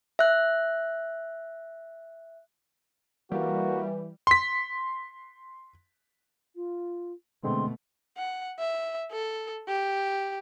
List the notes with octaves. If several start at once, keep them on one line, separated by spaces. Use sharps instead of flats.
E5 F#6
E3 G3 A#3 F#4
C6 B6
F4
B2 D3 G#3 A3 C4 C6
F#5
E5
A4
G4